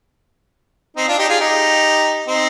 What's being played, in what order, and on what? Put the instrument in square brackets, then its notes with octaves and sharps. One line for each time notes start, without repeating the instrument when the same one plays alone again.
[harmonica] C4 D#4
D4 F4
D#4 G4
F4 G#4
D#4 G4
C4 D#4